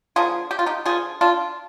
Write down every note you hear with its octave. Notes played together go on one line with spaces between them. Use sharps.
D3 F3 A#3 F4 G#4
G4
F4
D#4 G4
D3 F3 G#3 F4 G#4
D4 F4